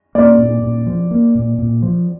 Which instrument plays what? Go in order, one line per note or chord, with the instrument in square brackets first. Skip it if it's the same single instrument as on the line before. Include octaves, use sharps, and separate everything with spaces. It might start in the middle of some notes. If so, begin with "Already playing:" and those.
[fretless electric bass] A#3 [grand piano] D5
[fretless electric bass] A#2
A#2
F3
A#3
A#2
A#2
F3